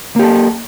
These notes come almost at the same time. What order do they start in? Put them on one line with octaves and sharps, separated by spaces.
A#3 G4 A4